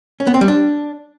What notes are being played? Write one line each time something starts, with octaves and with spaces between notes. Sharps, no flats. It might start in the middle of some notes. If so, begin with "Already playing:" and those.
C#4
B3
C4
G3
D4